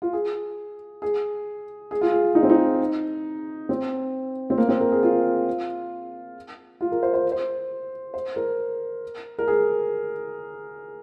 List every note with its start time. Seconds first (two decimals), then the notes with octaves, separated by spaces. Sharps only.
0.02 F4
0.13 G#4
1.02 G#4
1.91 G#4
2.01 F4
2.11 G#4
2.35 D#4
2.43 C4
2.50 D#4
3.69 C4
4.50 C4
4.58 A#3
4.69 C4
4.81 A#4
4.92 G#4
5.03 F4
6.81 F4
6.92 A#4
7.03 C5
7.14 C5
7.32 C5
8.14 C5
8.36 A#4
9.39 A#4
9.48 G#4